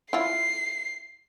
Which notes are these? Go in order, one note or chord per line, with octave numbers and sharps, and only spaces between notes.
E4 F4 C7